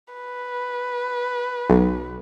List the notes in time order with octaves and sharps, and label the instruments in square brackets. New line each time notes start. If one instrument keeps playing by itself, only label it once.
[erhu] B4
[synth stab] B1